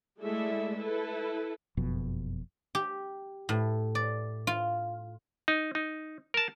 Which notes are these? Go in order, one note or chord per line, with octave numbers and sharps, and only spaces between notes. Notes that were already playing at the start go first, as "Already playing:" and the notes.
G#3 A3 E4 A4 D5 E5
E4 A4 B4
F#1 F2 B2
G4
A2
D5
F4
D#4
D#4
A#4 A5